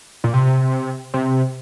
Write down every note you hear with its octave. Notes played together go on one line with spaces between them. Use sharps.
A#2
C3
C3